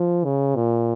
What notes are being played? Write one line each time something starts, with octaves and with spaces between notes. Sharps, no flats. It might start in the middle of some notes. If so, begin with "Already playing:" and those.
Already playing: F3
C#3
A#2